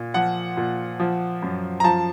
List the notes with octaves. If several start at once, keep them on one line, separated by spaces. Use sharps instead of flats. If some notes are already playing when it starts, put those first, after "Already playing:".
Already playing: A#2
F3 F#5
A#2
F3
F#2
A#5
F3 A5